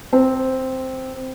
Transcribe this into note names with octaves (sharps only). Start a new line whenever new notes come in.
C4